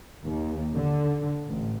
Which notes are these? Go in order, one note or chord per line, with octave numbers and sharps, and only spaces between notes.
D#2
D3
A1